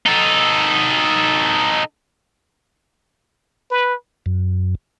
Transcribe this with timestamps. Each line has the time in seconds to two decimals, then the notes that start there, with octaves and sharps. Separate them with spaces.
0.06 D#4 A4
3.71 B4
4.26 F#2